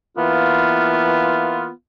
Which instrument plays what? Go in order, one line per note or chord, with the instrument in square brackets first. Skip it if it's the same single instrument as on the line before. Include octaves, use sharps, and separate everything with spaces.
[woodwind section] E3 A#3 B3 F4